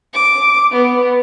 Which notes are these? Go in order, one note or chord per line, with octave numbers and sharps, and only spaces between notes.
D6
B3